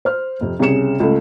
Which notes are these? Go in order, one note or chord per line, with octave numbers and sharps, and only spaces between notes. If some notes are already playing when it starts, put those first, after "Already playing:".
C5 F6
F2 C3
C2 C#3 G#4 C#7 E7
C#2 A3